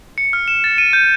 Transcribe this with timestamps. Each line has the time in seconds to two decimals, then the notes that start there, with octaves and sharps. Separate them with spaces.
0.18 C#7
0.33 F6
0.48 E7
0.64 A6
0.78 D#7
0.93 G6